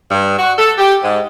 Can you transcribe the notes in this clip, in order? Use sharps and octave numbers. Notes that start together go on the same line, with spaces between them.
G2
F#4
A4
G4
G#2